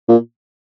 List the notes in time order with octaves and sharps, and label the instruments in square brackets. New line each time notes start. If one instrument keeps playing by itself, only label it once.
[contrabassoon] A#2